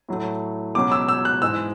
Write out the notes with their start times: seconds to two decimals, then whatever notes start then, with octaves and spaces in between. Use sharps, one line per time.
0.09 A2 F#3 A3
0.75 C#2 B2 F#3 C#4 D6
0.92 E6
1.08 E6
1.25 F#6
1.42 G#2 E3 G#3 E6